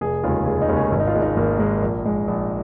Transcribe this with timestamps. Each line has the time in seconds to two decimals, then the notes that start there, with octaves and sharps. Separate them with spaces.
0.01 F1 G#4
0.23 D#2 C#3 G#3 F4
0.46 F1 G#4
0.62 D#4
0.69 D#2 C#3 G#3
0.76 C#4
0.92 G#1
1.00 D#4
1.07 F4
1.15 G#2 G#3
1.22 D#4
1.37 G#1 A#3
1.59 G#2 G#3
1.82 A#1
2.05 G#2 G#3
2.28 A#1